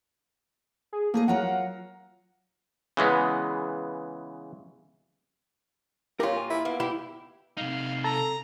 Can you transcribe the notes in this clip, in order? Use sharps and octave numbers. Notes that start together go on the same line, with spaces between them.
G#4
A3 A#3 G#4 D#5
F#3 F4 A#4 F#5
C#3 E3 G#3 B3
A#2 F4 G4 A#4 C#5
G#5
E4
A#3 B3
E4 G4
C3 D#4 F5
A4 A#5